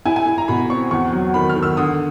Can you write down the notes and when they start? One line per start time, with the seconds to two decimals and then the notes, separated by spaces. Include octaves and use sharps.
0.05 E4 G#5
0.16 G#5
0.26 E4
0.38 A#5
0.48 B2 B5
0.70 C4 C#6
0.91 E2 C#6
1.12 F#3
1.34 D#3 B5
1.49 F6
1.55 D#3
1.63 E6
1.77 D3 D#6